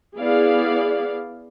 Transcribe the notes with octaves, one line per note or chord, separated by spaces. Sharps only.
B3 E4 G#4 D5 F5